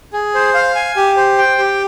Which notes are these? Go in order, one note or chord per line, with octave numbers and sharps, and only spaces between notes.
G#4
C5
F5
G#5
G4
C5
G5
G4